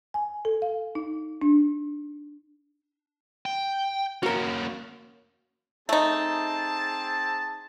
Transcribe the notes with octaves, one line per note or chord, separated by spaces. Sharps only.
G#5
A4
F5
D#4
D4
G5
A#3 C#4 F#4 A#4
A3 C4 D#4 G#4 A5